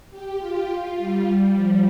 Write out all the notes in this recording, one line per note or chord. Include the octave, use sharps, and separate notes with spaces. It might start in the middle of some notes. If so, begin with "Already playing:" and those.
G4
F4
G3
F3